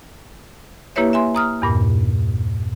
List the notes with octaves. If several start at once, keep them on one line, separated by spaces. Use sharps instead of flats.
A#3 E4 G4 B4 C#5 E5
E5 G#5 C6
A#5 D#6 F6
E2 G2 A#2